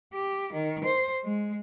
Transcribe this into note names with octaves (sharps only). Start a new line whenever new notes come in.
G4
D#3
C5
G#3